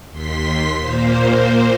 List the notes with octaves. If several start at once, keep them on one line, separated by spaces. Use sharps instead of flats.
D#2 C6 B6
A#2 A#3 C5